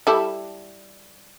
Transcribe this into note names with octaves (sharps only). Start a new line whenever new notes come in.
G3 E4 A4